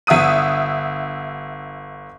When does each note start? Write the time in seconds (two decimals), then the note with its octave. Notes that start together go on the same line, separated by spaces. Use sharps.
0.07 G1 E5 F#5 D#6 D#7